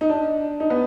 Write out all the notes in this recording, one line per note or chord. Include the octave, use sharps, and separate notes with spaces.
D#4
D4
D#4
B3